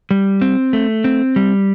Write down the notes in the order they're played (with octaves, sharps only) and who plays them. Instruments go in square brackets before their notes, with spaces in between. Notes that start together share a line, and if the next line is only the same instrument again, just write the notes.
[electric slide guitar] G3
C4
A3
C4
G3